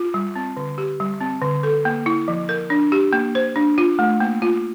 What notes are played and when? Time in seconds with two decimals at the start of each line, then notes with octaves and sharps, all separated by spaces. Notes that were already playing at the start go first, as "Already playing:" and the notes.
Already playing: F4
0.14 G3
0.36 C4
0.57 D3
0.78 G4
1.00 G3
1.21 C4
1.42 D3
1.63 A4
1.85 A#3
2.06 E4
2.28 F3
2.49 A#4
2.70 D4
2.92 G4
3.13 A#3
3.35 C5
3.56 D4
3.78 F4
3.99 A3
4.20 A#3
4.42 F4